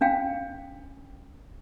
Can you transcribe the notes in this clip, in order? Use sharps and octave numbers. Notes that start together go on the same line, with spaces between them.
C#4 D4 F5 G5